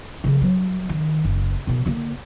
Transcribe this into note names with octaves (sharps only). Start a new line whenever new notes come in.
C#3 F3
F#3 G3
D#3
F#1
B2 D#3
D3 A#3